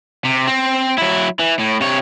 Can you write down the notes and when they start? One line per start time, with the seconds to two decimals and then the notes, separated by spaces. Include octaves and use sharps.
0.25 C3
0.47 C4
0.98 F#3 E4
1.39 E3
1.59 A2
1.81 C3 C#5